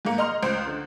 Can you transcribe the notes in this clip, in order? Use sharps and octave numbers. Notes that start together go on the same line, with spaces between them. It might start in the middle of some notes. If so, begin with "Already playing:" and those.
G#2 G#3 A#3 C#7
D#5 A#5 C6 F6 F7
C#2 C5 G6 D7
D3